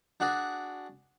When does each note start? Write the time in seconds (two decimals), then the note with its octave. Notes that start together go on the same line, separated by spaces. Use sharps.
0.20 D4 F#4 G#4 D5